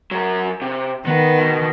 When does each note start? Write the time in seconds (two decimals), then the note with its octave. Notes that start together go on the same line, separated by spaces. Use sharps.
0.11 F#3 A#4
0.62 C3
1.07 D#3 B3 B4
1.39 B2